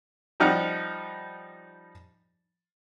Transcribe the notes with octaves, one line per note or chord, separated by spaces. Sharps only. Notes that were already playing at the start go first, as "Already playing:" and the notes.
F3 G3 D#4 F#5 F6